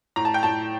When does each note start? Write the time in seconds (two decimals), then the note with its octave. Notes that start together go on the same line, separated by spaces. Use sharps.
0.16 A2 A#5
0.25 A5
0.34 G5
0.43 A2 A5